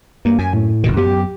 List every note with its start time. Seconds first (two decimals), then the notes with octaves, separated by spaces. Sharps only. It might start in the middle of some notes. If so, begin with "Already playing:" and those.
0.25 G2 A#3
0.39 F#2 G#5
0.53 A2
0.84 F#1 B2 D#3
0.97 F#2 F#3 B3 G4